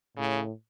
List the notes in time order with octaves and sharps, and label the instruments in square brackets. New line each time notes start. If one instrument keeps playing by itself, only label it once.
[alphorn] A2 [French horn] C#3